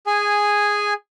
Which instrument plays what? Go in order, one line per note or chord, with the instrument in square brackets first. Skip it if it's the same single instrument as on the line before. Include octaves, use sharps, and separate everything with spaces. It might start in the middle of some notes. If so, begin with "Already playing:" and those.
[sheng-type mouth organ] G#4 G#5